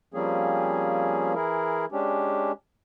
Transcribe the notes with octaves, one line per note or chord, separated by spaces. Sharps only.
F3 G3 A#3 C4 C#4 G#4
E3 E4 G#4 A#4
G#3 C#4 D4 G4